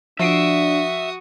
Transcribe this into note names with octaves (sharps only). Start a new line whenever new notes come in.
F3 D4 F#4 E5 D#6 C7 D7